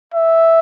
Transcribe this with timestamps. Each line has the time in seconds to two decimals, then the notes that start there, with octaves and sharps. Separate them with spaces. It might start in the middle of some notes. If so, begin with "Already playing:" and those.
0.14 E5